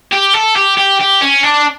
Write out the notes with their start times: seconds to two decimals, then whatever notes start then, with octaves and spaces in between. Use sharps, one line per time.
0.12 G4
0.33 A4
0.56 G4
0.77 G4
1.00 G4
1.21 C#4
1.43 D4